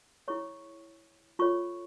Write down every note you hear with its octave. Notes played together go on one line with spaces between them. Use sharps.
E4 G#4 C#5 C#6
F4 A4 C#5 C#6